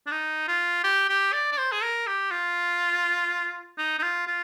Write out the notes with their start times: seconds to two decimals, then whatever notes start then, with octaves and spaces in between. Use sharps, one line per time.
0.07 D4
0.11 D#4
0.48 F4
0.84 G4
1.09 G4
1.33 D5
1.52 D5
1.58 C5
1.72 G#4
1.82 A#4
2.07 G4
2.31 F4
3.78 D#4
3.99 D#4
4.02 F4
4.27 F4